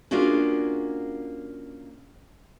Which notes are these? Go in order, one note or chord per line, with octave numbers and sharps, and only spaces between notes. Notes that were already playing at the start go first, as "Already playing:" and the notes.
A#3 C#4 D4 F4 F#4 G#4